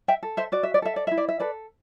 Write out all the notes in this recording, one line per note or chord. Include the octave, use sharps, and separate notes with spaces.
E5 G5
A4
C5 E5
F#4 D5
E5
D5
A4 E5
D5
E4 E5
D5
E5
A4 B4 D5